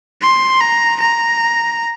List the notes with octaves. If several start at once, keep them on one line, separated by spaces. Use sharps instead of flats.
C6
A#5
A#5